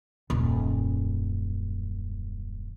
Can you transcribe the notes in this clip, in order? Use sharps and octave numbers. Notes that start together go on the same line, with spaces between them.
D#1 F#2